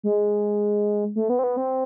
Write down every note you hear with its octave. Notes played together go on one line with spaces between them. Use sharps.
G#3
A3
B3
C4
B3
C4